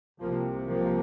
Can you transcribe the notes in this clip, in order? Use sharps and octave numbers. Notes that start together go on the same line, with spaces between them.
C2 C3 F3 A#3
F3 A#3